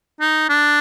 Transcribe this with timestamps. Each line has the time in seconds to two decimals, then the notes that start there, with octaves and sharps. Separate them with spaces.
0.20 D#4
0.49 D4